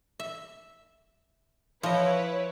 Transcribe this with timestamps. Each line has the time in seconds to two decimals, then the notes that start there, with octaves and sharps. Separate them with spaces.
0.20 E5
1.83 F3 E4 B4 C#5 D#5